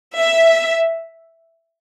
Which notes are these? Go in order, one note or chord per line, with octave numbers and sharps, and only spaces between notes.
E5